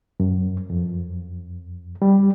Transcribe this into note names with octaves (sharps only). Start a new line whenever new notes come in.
F#2
F2
G3